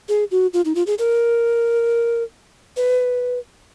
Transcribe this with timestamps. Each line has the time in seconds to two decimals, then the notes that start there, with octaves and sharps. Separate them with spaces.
0.09 G#4
0.31 F#4
0.54 F4
0.65 D#4
0.75 F4
0.87 G#4
0.99 A#4
2.77 B4